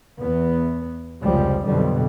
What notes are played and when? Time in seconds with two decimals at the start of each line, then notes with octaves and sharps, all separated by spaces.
0.20 E2 B3
1.23 F1 C#2 F3 G3 G#3
1.66 B1 F2 B2 D3 G3